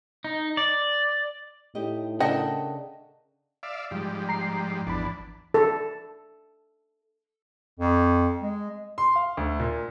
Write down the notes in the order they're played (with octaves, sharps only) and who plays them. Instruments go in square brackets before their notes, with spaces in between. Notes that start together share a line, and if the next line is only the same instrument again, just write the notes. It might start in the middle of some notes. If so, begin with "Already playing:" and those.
[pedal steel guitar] D#4
D5
[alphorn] A2 [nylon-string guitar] D#4 G4 D#5
[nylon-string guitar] C#3 D4 A4 [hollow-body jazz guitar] A#4 F#5 G5 [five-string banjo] D#5 E5
[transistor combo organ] D5 E5 F5
[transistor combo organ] G#2 G3 [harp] F3
[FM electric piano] A#5 C7
[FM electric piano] G#1 B5 [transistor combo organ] E2 D4
[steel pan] A4
[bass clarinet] F2
G#3
[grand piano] C6
F5
D2
A#2